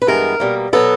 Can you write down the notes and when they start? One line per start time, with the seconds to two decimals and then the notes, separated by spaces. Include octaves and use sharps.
0.02 B4
0.07 G2 E3 G#3 B3 A#4
0.40 B2 G3 A#3
0.73 B2 F#3 B3 A4